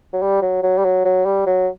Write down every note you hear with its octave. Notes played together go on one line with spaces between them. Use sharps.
F#3
G3
F#3
F#3
G3
F#3
F#3
G3
F#3